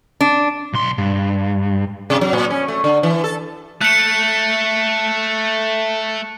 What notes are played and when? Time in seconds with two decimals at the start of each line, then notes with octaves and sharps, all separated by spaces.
0.21 D4
0.73 B1 C6
0.98 G2
2.10 C3
2.21 F#3
2.33 A#2
2.50 C#4
2.68 A3
2.84 D3
3.03 E3
3.24 A4
3.81 A3 F#6 C#7